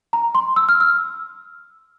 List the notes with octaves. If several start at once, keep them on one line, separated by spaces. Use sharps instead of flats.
A#5
C6
E6
F6
E6